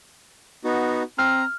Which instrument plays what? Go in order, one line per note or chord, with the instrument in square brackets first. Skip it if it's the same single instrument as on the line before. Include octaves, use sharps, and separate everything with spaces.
[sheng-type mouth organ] B3 D#4 F#4
[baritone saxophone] C4 [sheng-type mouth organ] A#5 [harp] F6